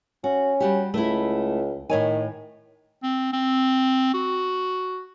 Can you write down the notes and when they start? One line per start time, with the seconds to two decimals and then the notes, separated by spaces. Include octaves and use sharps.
0.24 C#4 F#4
0.60 G3 F#4 G4
0.94 C#2 A3 E4
1.90 A2 D#3 C#5 G#5
3.03 C4
3.33 C4
4.14 F#4